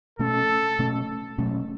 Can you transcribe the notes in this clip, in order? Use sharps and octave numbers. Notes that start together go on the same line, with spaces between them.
B2 A3 C#4 A4
B2 A3 C#4
B2 F#3 A3 C#4